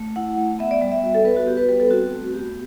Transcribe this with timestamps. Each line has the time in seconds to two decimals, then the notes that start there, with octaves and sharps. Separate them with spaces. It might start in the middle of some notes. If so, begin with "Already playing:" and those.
Already playing: A3
0.16 E4 F#5
0.38 A3
0.59 B3 E5
0.71 D5
0.81 G3 D5
0.92 E5
1.03 F#4 E5
1.15 A4
1.24 B3 B4
1.37 F#4
1.47 B3 G4
1.57 B4
1.69 G3 B4
1.80 A4
1.90 C4 F#4
2.12 A3
2.34 B3 G4